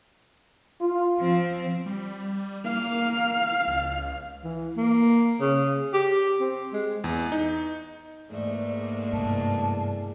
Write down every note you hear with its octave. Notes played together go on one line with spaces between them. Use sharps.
F4
F3 C4
G3
A#3 F5
C#2
E3
A#3
C#3
G4
C4
G#3
E2
D#4
E2 G#2 A3 A#3 G#4 D5
G2 C3 A5